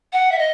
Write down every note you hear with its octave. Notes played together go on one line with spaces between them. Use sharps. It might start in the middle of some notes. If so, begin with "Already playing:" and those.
F#5
E5
D#5